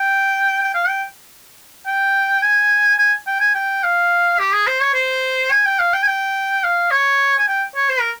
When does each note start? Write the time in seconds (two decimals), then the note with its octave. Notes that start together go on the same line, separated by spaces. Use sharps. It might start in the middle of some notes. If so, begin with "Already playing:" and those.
Already playing: G5
0.63 G5
0.75 F5
0.88 G5
1.87 G5
2.42 G#5
2.99 G#5
3.27 G5
3.40 G#5
3.55 G5
3.84 F5
4.39 G4
4.53 G#4
4.67 C5
4.81 C#5
4.94 C5
5.51 G#5
5.65 G5
5.80 F5
5.94 G5
6.03 G#5
6.07 G5
6.64 F5
6.91 C#5
7.38 G#5
7.48 G5
7.76 C#5
7.90 C5
8.00 A#4